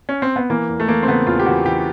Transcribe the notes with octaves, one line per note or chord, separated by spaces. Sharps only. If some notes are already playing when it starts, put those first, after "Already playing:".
C#4
C4
B3
E3 A#3
E2
A3
E3 A#3
C4
C#3 B3
E2 F4
G4
E3 F#4
E3 G4